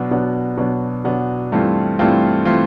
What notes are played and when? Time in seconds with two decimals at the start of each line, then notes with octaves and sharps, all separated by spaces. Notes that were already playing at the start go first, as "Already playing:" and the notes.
Already playing: B2 F#3 B3 D4
0.11 B2 F#3 B3 D4
0.57 B2 F#3 B3 D4
1.04 B2 F#3 B3 D4
1.52 G2 E3 A3 C4 F4
1.99 G2 E3 A3 C4 F4
2.45 E3 A3 C4 F4